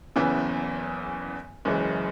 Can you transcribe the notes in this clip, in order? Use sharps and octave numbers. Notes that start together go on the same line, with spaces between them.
F#1 E2 C#3 E3 B3
F#1 F#2 E3 G#3